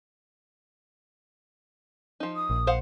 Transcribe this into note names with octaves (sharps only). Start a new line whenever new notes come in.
F3 D#4
D#6
A#1
C5 F5 F#5